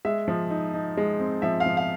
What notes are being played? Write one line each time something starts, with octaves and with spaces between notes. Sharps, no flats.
G#3 E5
F3
D#4
D#4
G#3
C4
F3 E5
F5
F3
F5